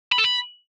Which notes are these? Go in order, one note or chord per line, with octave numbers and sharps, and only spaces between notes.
B5
A4
B5